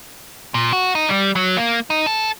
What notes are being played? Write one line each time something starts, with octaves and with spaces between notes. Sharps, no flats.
A#2
F#4
D#4
G3
F#3
A#3
D#4
A4